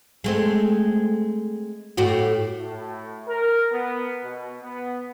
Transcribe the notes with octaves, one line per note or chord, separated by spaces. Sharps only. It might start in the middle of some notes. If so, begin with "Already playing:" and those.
G#3 A3 C4
A2 F#4 G4
A2
A#4
B3
B2
B3